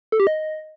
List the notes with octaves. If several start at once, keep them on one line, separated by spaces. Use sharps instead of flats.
A4
G4
D#5